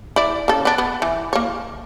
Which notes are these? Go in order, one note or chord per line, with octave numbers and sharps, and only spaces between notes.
E4 D5
C#3 A4
B3 D4
B3
E3
A#3 C#5